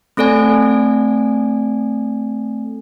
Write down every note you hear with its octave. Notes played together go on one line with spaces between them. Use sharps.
A3 C4 A4 D5 G#5